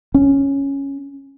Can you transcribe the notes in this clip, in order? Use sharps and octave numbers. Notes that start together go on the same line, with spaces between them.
C#4